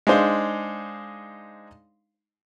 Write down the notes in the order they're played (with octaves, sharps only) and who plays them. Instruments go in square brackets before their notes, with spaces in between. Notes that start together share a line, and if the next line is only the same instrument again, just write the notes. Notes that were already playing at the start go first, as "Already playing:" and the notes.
[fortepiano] G#3 D4 D#4 C5 F5